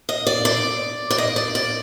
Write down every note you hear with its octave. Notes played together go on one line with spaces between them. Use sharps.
D#5
D5
D5
D5
D#5
D5
D5